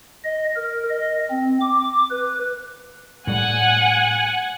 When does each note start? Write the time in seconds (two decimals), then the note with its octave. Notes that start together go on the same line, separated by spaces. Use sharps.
0.24 D#5
0.56 A#4
0.89 D#5
1.31 C4
1.61 D6
2.10 B4
3.27 A2 G3 F#5 G#5